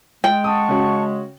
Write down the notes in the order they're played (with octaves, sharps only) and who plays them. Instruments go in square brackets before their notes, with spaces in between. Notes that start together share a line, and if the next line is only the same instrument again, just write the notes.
[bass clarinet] G#3 [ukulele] G5
[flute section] F#5 A5 C#6 [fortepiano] D#6
[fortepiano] C#3 C#4 F#4